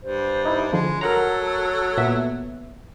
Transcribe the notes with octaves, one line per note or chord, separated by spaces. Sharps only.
G2 C5
D#4 E4
D3 F3 G#3
F#3 A4 A#4 F#5 A#5
A#2 B3 E5